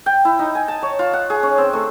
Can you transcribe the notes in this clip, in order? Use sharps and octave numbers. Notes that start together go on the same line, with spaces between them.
G5
E4
D#4
G#5
A5
C#5
F4
F#5
G#4
C#4
C4
A3